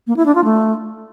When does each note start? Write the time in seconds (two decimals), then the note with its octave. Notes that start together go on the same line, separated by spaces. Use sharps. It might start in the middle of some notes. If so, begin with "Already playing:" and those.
0.07 A#3
0.17 E4
0.26 D4
0.35 F4
0.44 A3